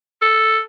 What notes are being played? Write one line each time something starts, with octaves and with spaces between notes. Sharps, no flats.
A4